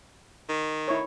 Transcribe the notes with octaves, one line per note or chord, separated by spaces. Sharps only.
D#3
E4 C#5